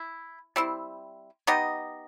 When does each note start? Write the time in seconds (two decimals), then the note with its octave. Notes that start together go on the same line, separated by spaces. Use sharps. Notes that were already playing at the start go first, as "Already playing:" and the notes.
Already playing: E4
0.56 G3 C4 E4
1.47 B3 D#4 G4 D#5